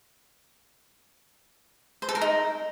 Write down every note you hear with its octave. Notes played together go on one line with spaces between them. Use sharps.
C5
A4
A#4
D#4